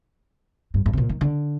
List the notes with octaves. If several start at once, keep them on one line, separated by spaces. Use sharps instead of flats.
G2
G2
C3
A#2
D#3
D3